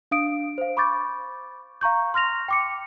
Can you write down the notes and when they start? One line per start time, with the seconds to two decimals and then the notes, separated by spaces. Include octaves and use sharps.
0.11 D4 F5 D#6 D7
0.58 C5 F5
0.77 B5 C#6 D6 G6 A6
1.81 F5 A#5 C#6 G6
2.14 C6 F6 A#6 F7
2.48 G5 D6 C#7